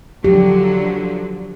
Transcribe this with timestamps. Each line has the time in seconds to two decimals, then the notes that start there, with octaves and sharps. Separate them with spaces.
0.24 D3 F3 F#3 G4